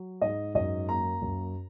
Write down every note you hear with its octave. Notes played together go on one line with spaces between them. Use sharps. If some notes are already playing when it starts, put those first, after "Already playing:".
Already playing: F#3
G#2 D#5
F#2 D#5
A#3 A#5
F#2